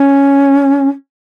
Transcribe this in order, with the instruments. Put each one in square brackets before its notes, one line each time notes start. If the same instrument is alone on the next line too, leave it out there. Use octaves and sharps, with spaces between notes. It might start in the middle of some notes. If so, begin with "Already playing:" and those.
Already playing: [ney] C#4